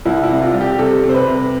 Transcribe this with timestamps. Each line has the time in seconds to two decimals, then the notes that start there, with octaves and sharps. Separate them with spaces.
0.05 C2 E4
0.24 E4
0.29 C3
0.42 F4
0.54 G3
0.61 G4
0.72 G4
0.79 C3 A4
1.03 C3
1.09 C5
1.15 B4
1.27 C3